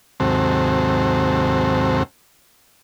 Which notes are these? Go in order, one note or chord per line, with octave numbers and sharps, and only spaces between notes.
D#2 G#2 C3 F#3 C4 A4